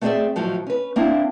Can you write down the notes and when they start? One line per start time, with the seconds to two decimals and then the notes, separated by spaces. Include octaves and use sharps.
0.01 A3 B3 C4 G#4 D5 E5
0.36 A2 D#3 F3 F#3
0.67 C#4 B4
0.96 A#3 C4 D4 E4